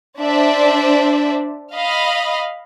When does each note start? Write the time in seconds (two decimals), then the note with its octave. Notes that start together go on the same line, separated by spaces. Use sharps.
0.19 D4 C5 D5 E5
1.74 D#5 F5 B5